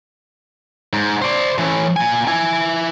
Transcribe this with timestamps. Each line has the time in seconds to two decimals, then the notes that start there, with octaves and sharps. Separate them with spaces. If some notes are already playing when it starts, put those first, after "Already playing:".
0.93 G#2
1.22 C5 D5
1.58 A2 E3
1.96 A#2 G#5
2.28 E4 G#5